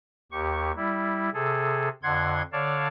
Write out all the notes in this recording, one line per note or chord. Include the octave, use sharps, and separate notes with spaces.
D#2 G4 C#6
G3 E4
C3 G#4 A4
F2 D3 F#5 C6 G#6
D3 C#5 D5 F5 A5